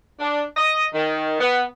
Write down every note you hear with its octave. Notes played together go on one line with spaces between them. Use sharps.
D4
D#5
D#3
B3